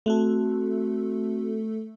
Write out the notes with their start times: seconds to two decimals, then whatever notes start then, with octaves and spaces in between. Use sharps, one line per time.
0.06 A3 C4 F#4 A4